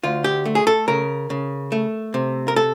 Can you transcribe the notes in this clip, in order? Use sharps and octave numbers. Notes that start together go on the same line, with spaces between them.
D2 F4
G4
A3
G#4
A4
C#3 A#4
C#3
A3
C3
A#4
A4